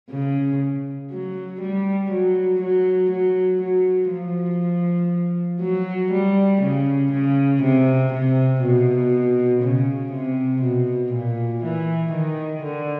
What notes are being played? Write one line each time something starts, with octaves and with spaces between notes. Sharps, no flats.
C#3
F#3
G3
F#3
F#3
F#3
F#3
F3
F#3
G3
C#3
C#3
C3
C3
B2
C#3
C3
B2
A#2
E3
D#3
D3